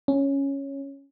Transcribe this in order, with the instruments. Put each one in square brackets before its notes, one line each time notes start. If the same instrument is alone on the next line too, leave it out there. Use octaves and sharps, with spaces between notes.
[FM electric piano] C#4